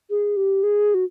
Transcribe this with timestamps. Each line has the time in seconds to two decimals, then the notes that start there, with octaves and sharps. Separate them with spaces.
0.10 G#4
0.37 G4
0.63 G#4
0.94 F#4